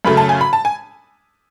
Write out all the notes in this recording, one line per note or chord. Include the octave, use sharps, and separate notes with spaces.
F#2 C#3 F#3 A3 B5
A5
G#5
B5
A5
G#5